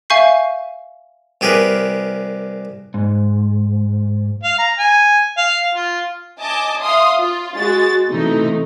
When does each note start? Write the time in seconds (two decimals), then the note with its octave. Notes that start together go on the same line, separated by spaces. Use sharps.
0.10 E5 F5 G#5 C#6 G6 C7
1.41 C2 G4 G#4 A#4 B4
2.94 G#2
4.44 F5
4.59 A#5
4.79 G#5
5.38 F5
5.75 F4
6.39 D#5 G#5 A5 D6
6.82 E5 F5 C6 D#6
7.17 F4
7.56 G#3 F#4 A6
8.11 C3 E3 A3 D#4